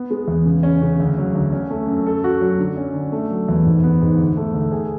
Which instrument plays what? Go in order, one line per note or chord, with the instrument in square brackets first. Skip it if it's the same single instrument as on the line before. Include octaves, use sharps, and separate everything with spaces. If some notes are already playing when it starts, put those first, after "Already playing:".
Already playing: [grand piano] B3
G#3
E2
C#3
C#4
C#3
D2
F#3
D2
C#4
A3
F#2
A4
F#4
F#3
D3
C#4
D3
A3
F#3
E2
G#2
B3
G#2
D2
A3
D2
G#4